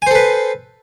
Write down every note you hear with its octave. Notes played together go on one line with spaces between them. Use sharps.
A4 B4 C5 G#5